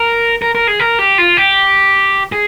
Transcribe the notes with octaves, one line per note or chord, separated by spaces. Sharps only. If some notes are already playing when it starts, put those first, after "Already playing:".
Already playing: A#4
A#4
A#4
G#4
A#4
G4
F4
G4
G#4